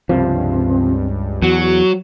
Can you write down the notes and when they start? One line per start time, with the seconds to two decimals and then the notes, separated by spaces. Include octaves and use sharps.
0.09 C#2 G2 C3 F3 C4
1.43 E2 F#3 F#4